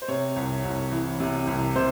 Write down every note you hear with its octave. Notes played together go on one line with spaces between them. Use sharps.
C5
C3 C#5
C2
C2
E3
C3
C2
C3 C5